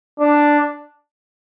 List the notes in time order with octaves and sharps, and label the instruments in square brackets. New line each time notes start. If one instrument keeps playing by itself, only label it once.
[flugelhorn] D4